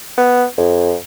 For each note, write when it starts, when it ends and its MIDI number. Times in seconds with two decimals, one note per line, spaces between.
0.18 0.45 59
0.58 0.95 41